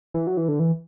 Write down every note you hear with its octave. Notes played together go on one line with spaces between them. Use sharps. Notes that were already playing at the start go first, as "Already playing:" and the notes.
E3
F#3
E3
D3
E3